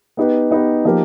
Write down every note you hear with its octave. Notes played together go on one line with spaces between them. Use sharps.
B3 D#4 G4 B4
B3 D#4 G4 B4
F3 A#3 D#4 G4 A#4